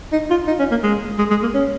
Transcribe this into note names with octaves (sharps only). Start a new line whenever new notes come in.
D#4
F4
D#4
C#4
A#3
G#3
G#3
G#3
A#3
C#4